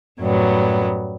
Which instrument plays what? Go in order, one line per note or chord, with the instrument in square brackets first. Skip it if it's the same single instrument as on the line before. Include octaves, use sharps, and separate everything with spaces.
[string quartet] F#2 A2 F#3 G3 B3